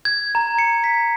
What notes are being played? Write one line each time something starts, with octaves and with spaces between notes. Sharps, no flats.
G#6
A#5
C#7
B6